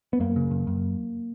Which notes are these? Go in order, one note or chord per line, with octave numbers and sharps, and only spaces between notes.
B3
F#2 A#3
C#3
F#2
F#2